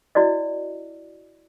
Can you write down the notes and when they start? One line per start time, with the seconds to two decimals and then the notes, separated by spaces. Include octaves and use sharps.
0.15 E4 F#4 D5 D#5